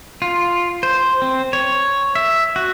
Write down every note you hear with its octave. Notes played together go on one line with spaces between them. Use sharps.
F4
C5
C4
C#5
E5
F#4